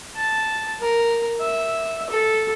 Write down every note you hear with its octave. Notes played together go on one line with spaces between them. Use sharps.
A5
A#4
E5
A4